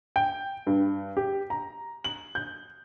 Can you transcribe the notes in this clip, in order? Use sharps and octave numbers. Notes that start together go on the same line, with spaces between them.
G5
G2
G4
A#5
F#7
G6